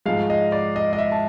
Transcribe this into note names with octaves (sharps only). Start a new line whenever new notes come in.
G#2 F3 G#3 F5
D#5
D5
D#5
D#5
E5
A5